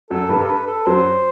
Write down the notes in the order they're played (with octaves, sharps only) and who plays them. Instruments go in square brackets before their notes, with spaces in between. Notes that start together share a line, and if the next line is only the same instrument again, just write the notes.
[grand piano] F#2 F#3 [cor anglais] A4
[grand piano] G2 G3 [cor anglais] B4
[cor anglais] A4
B4
A4
[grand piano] F#2 F#3 [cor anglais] C5